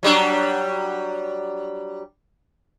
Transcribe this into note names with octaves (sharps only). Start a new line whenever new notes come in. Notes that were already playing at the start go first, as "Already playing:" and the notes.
F#3 G3 D4